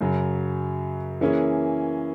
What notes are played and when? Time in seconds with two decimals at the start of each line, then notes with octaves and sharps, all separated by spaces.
0.01 F#2 C#3 F#3
1.21 E3 A#3 C#4 E4 G#4